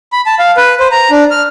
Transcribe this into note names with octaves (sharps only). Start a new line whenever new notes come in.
B5
A5
F5
B4
C5
A#5
D4
F6